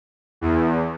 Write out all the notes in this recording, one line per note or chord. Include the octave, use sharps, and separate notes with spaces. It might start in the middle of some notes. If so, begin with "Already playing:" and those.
E2